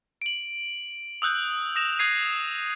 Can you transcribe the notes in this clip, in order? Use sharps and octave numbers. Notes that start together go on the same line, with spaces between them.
D7 F#7
D#6 E6 F#6 G6
D#6 A#6 E7 F7
D#6 F#6 G#6 C7 D#7